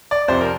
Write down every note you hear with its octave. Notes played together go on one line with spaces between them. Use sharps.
D5
F2 C3 F3 C5
A#4